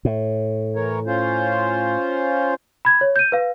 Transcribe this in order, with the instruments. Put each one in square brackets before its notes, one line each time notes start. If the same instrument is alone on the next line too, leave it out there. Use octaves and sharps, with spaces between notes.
[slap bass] A2
[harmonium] E3 A#4 C#5
C#4 F4 C5
[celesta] B5 G#6
C#5
G6 D#7
B4 F5